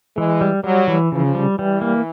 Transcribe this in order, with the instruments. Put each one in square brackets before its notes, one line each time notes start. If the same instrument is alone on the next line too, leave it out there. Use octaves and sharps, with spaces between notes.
[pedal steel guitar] E3 [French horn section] G#3
[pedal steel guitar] G3
[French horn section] F#3 [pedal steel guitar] G3
[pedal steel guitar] E3
[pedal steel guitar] C#3 [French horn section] F3
[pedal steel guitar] G3
[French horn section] E3 [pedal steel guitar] G3
[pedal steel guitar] A#3